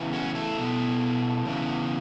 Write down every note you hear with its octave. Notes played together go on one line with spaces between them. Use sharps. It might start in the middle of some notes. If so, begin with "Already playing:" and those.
Already playing: C#3 E3 B3
C#4 F#4
E4 A4
B2 B3
C#3 E3 B3